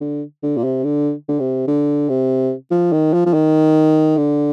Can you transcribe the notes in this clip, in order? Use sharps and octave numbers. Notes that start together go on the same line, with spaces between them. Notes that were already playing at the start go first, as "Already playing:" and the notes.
D3
D3
A#2
C3
D3
D3
C3
D3
C3
F3
D#3
F3
F3
D#3
D3